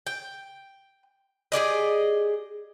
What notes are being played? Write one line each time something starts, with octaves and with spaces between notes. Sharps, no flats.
G5
G4 G#4 D5 D#5